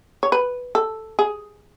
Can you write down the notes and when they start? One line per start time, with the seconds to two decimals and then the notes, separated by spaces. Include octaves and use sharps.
0.23 C#5
0.32 B4
0.75 A4
1.19 G#4